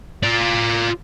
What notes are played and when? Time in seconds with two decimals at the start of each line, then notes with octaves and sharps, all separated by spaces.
0.23 F4 D5